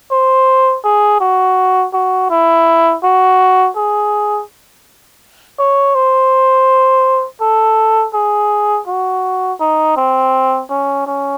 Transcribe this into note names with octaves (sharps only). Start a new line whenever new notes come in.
C5
G#4
F#4
F#4
E4
F#4
G#4
C#5
C5
A4
G#4
F#4
D#4
C4
C#4
C#4